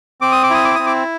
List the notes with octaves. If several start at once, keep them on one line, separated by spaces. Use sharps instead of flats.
C4 D6
D#6
D6
E4 D#6
D6
C4 D#6
D6